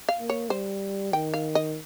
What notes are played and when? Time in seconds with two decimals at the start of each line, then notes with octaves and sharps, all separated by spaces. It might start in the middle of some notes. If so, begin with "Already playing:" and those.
0.09 F5
0.20 A#3
0.30 C#5
0.50 G3 C5
1.13 D#3 G5
1.34 F5
1.55 D#5